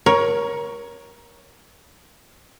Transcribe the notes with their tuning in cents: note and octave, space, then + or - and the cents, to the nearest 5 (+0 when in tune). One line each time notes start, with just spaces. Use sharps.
A#4 +25 C#5 +5